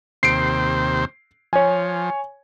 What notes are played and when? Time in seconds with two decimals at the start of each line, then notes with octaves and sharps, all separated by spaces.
0.23 D#2 C3 C5 C7 D7
1.53 F3 C#5 G#5